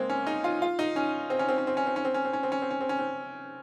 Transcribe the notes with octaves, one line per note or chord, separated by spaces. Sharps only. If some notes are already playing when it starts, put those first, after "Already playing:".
Already playing: G#3 A#3 C4
C#4
D#4
F4
F4
D#4
C#4
C4
C#4
C4
C#4
C4
C#4
C4
C#4
C4
C#4
C4
C#4
C4
C#4
C4
C#4
C4
C#4
C4